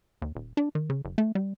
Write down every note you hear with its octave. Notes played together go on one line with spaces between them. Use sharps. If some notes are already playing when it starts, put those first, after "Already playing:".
D#2
D#1
D4
D#3
C#3
F#1
A3
G3